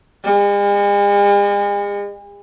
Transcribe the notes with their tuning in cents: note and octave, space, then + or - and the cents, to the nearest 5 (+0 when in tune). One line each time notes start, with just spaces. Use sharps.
G#3 -45